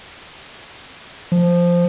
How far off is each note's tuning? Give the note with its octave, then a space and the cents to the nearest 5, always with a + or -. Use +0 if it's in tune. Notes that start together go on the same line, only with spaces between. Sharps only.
F3 -5